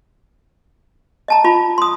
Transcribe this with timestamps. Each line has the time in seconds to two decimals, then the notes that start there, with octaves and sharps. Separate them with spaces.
1.28 D#5 A5 A#5
1.44 F4 B5
1.78 C6 D#6